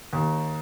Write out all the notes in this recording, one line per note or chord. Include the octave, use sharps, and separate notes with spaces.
D#2